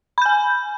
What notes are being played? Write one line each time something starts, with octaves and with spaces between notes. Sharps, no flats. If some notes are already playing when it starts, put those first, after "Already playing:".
G#5 B5 G6